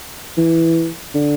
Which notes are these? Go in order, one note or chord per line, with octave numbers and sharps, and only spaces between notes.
E3
D3